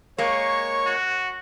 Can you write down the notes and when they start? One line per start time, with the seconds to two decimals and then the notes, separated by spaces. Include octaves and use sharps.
0.18 G#3 A#3 C#5 C#6
0.86 F#4